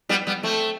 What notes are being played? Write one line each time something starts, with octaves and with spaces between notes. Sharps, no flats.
G3 B3
G3 B3
A3 C4